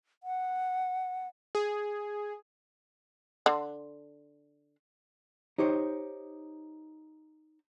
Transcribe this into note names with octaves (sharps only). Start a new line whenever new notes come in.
F#5
G#4
D3
D#4 G4 C5 C#5